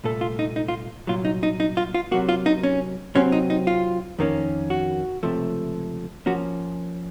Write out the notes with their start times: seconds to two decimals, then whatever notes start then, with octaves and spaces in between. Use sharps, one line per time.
0.04 C2 A#2 A3 A4
0.21 F4
0.39 D#4
0.56 D#4
0.68 F4
1.07 C2 A#2 F#3 F4
1.25 D#4
1.43 D#4
1.60 D#4
1.77 F4
1.94 F4
2.11 C3 F#3 A#3 F#4
2.29 F4
2.46 D#4
2.63 C#4
3.15 C3 F#3 C4 C#4
3.32 D#4
3.50 D#4
3.67 F4
4.19 F2 D#3 A#3 C#4
4.70 F#4
5.23 C#2 C3 F3 A3
6.26 F3 A#3 C#4 F#4